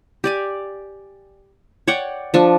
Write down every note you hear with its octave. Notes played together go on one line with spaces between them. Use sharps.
G4 D5 G#5
C#5 D5 F#5 G5
F3 D4 C#6